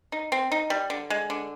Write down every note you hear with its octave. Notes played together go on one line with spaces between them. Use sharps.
D#4
C4
D#4
G3
D3
G#3
D3